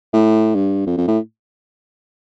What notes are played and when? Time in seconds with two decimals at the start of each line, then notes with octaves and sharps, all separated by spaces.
0.13 A2
0.55 G2
0.87 F2
0.97 F2
1.08 A2